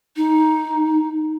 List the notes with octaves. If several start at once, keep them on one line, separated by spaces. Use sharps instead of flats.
D#4